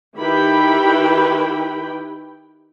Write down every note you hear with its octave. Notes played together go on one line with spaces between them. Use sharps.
D#3 E4 G4 B4 G5 B5